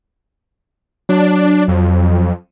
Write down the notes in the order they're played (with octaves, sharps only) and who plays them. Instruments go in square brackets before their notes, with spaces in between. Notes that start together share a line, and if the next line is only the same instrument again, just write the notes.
[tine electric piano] F#3 [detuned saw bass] D4
[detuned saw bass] F2